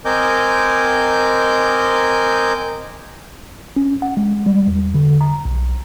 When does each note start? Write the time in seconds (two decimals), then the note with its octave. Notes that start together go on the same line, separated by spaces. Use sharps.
0.05 C4 A#4 D#5 G#5 D6 G6
3.76 C#4
4.02 F#5
4.17 G#3
4.46 G3
4.67 E2
4.95 D3
5.21 A#5
5.45 B1